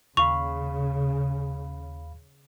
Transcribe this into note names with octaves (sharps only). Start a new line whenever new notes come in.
D#2 C#3 F5 B5 C#6 F7